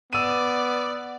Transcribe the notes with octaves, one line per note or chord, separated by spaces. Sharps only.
B3 D5 E6 D#7